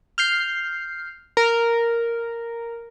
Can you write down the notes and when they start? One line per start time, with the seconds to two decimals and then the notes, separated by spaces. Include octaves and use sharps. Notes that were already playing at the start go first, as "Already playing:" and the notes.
0.18 F6 G6 C7
1.37 A#4